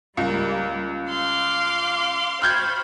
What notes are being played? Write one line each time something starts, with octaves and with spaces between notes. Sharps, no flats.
C#2 G3 A#3
F5 C6 D6
C5 B5 C#6 F6 G6 G#6